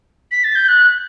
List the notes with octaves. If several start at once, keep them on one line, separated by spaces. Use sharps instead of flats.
B6
A6
G6
F#6